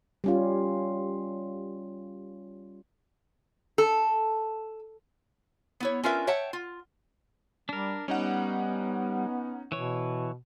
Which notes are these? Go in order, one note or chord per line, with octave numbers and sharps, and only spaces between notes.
G3 C#4 F4
A4
B3 E4 C#5
C#4 D4 F4 A#4 B4 E5
C#5 E5 F#5 G5 A5
F4
G3 D4 A#4
G3 B3 C#4 D#4 F#5
B2 E3 C#5